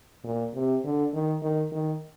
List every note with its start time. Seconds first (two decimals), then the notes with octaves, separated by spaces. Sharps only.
0.24 A#2
0.54 C3
0.84 D3
1.13 D#3
1.42 D#3
1.72 D#3